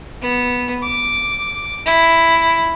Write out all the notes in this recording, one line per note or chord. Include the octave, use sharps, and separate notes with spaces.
B3
D6
E4